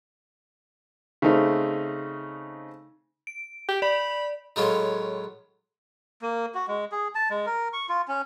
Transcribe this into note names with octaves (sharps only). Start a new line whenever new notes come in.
C#3 A3 C4 D#4
D7
G4
D5 B5
A2 D#3 F#3 G#3 C#4 F4
A#3
F#4
G#3
G#4
A5
G#3
A#4
C#6
F4
C#4